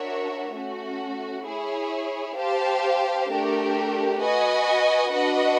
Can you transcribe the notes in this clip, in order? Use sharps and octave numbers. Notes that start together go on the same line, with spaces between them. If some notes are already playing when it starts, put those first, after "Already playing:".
Already playing: D4 F#4 A#4 C#5 E5
A3 C#4 F#4
E4 G#4 C#5
G4 C5 F5 A5
A3 D4 G4 A#4
F#4 B4 D#5 G#5
D4 F#4 B4 D#5 F#5